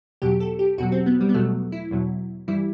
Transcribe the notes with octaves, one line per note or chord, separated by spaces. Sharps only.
E2 B2 F#3 G4
A4
G4
E2 B2 F#3 F#4
C4
B3
G3
B3
E2 B2 F#3 A3
E4
E2 B2 F#3
G2 E3 G3 E4